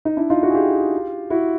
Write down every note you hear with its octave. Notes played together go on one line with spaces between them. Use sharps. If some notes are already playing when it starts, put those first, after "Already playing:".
D#4
D4 E4
D#4 F4
E4 F#4
G#4
F4 G4
E4 F#4